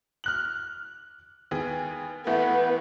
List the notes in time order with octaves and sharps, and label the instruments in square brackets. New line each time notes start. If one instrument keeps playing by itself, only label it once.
[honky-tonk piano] F6 F#6 F#7
D#2 B3 G#4
[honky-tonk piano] A1 E3 A3 [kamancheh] B3